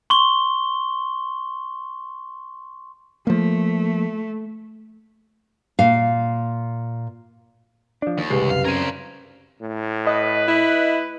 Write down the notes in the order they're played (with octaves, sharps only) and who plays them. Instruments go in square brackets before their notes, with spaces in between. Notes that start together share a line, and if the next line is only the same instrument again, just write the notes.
[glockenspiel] C6 C#6 G7
[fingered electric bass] F3 A#3 [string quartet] A3
[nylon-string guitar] A#2 F5
[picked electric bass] F3 D4
[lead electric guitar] D#2
[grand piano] F#1 C2 C7 [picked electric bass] G#3 [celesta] G4 B4
[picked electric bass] F#2 [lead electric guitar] F5
[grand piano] C#3 C4 D#7 [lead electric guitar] A#4 C5 [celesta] G#6
[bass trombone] A2
[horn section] B4 [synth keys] D#5
[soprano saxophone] E4